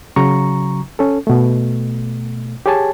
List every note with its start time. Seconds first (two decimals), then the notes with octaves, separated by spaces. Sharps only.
0.16 C#3 F#3 A#5 C#6
0.99 C#4 A4
1.27 B2 A3
2.66 G4 G#4 C#5 G#5 A5